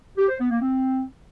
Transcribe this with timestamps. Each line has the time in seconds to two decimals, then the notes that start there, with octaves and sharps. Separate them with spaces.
0.18 G4
0.29 C5
0.40 B3
0.51 A#3
0.61 C4